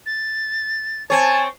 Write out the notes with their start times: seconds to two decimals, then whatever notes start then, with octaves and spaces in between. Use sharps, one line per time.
0.06 A6
1.10 C4 C#5 G#5 A5